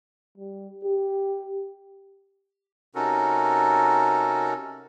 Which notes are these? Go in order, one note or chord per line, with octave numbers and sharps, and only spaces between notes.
G3
G4
C3 C#4 D#4 F#4 A4 A#4